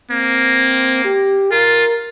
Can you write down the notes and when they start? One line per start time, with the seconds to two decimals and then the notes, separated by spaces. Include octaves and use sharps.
0.11 A#3 C4
1.05 G4
1.52 F4 A#4